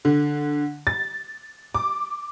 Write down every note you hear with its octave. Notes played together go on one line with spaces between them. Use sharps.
D3
A6
D6